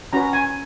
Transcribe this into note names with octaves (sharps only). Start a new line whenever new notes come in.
C#4 F#4 B4 A#5
G#5